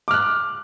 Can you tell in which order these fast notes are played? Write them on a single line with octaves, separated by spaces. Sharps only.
D6 F6 F#6